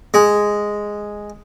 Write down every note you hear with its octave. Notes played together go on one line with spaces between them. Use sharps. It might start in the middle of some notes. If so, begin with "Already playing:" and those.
G#3